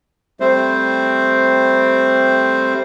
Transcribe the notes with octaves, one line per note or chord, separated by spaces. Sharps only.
G3 A3 C4 C5